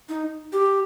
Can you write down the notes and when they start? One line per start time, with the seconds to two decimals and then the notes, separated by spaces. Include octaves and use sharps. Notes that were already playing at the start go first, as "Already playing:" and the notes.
0.09 D#4
0.53 G4